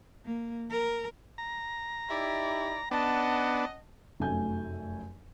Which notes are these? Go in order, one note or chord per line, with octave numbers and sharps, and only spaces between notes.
A#3
A#4
A#5
D#4 E4 G4 D5
B3 C#4 D4 D#5 F#5 A5
F1 F#2 F#3 A3 G#5 G6